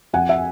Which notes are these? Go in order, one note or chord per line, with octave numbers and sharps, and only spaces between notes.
F2 F#5 G#5
E5 F#5